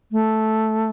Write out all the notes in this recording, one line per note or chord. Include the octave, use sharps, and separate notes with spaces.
A3